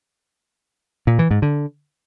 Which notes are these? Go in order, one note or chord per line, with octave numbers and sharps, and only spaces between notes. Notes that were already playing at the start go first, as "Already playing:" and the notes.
A#2
E3
G#2
D3